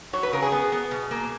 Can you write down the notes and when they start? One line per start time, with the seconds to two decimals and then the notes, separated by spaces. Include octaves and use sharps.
0.13 F#3 C#5
0.23 B4
0.32 C#3 A#4
0.42 G#4
0.52 B3
0.72 B3
0.91 B2
1.11 A#3